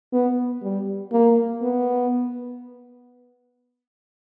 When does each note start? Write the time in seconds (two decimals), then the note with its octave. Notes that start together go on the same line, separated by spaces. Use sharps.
0.13 B3
0.63 G3
1.12 A#3
1.62 B3